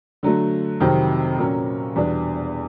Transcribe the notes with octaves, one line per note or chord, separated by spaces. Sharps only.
D3 F#3 A3
F2 C3 D#3 F#3
A#2 F#3 A#3 C#4
E2 B2 G3 B3 D4